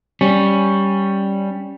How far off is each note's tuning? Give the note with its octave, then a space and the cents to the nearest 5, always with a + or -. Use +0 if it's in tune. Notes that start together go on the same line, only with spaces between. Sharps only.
G3 +0 C#4 +0